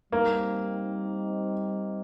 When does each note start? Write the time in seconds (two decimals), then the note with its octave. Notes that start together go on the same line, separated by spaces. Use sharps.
0.12 G3 A#3 C4 D#4